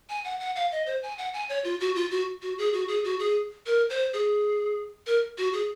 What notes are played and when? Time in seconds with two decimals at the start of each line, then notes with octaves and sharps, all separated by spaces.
0.10 G#5
0.24 F#5
0.40 F#5
0.56 F5
0.72 D#5
0.86 C5
1.03 G#5
1.18 F#5
1.33 G#5
1.49 C#5
1.64 F4
1.80 F#4
1.96 F4
2.11 F#4
2.42 F#4
2.58 G#4
2.73 F#4
2.88 G#4
3.04 F#4
3.19 G#4
3.66 A#4
3.90 C5
4.13 G#4
5.07 A#4
5.38 F#4
5.53 G#4